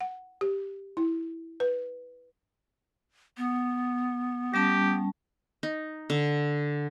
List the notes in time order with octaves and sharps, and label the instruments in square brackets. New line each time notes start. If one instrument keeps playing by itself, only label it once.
[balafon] F#5
G4
E4
B4
[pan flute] B3
[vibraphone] G3 C#4 A5 [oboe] G4
[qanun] D#4
D3